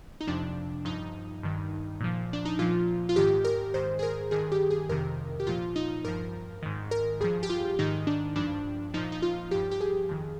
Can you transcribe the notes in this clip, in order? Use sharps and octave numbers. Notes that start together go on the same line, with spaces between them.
D#4
F2 C3 F3 D4
G2 F3 D#4
G2 D#3
A#2 F3
D4
D#4
A#2 F3 F4
F4
G#2 D#3 G4
A#4
G#2 D#3 C5
G#4
A#4
G2 D#3 G#4
G4
G#4
F2 C3 D#3 A#4
G4
A#2 F3 F4
D#4
G2 F3 A#4
G#2 D#3
A#4
G2 F3 G#4
G4
F4
G#2 D#3 D#4
D4
G2 F3 D4
A#2 F3 D#4
D#4
F4
G2 F3 G4
G4
G#4
F2 D#3